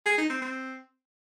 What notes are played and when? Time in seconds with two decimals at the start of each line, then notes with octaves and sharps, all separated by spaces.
0.06 G#4
0.18 D#4
0.30 C4
0.42 C4